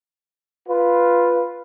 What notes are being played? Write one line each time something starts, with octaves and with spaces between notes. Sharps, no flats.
F4 B4